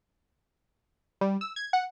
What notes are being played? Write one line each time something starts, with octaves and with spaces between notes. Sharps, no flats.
G3
E6
G#6
F#5